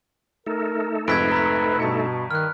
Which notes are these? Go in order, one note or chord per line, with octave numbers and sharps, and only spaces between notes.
A3 D#4 A4 A#4
F2 G#2 C3 B4 G#6 B6 D7
A#5 B5 B6
G2 B2 A5 C#7
D#3 F6 F#6